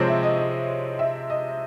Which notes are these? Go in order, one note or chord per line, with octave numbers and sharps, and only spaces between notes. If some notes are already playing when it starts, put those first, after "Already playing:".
Already playing: C3 F3 G#3 C4 C5 C#5
E5
D#5
D#5
E5
D#5